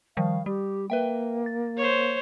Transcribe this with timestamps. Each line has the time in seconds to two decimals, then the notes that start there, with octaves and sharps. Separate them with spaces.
0.17 D#3 F3 G3 F5
0.46 G3 G4
0.90 A#3 B4 E5 G5
1.46 A6
1.77 C5 C#5